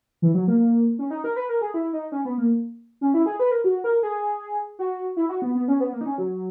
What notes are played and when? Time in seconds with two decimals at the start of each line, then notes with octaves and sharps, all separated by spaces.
0.22 E3
0.34 F#3
0.48 A#3
0.99 C#4
1.10 D#4
1.24 A#4
1.36 B4
1.49 A#4
1.61 G#4
1.74 E4
1.93 D#4
2.12 C#4
2.25 B3
2.38 A#3
3.01 C#4
3.14 E4
3.26 G#4
3.39 B4
3.51 A#4
3.64 F#4
3.84 A#4
4.03 G#4
4.79 F#4
5.17 E4
5.29 F#4
5.42 B3
5.55 B3
5.68 C#4
5.80 B3
5.93 A#3
6.01 D#4
6.06 C#4
6.18 F#3